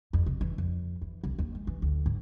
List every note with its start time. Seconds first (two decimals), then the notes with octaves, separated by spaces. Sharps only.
0.13 F2
0.26 C3
0.41 E3
0.58 F2
1.02 E3
1.24 C2
1.39 D#2
1.55 G#3
1.67 E3
1.82 D2
2.06 G#2